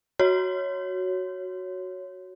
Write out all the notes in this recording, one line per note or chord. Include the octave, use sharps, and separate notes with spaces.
F#4 C#5